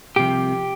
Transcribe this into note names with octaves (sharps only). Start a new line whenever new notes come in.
C2 C3 F3 G4